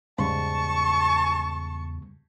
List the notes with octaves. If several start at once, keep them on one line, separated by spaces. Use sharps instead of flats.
E2 G#2 C#3 G3 A5 C#6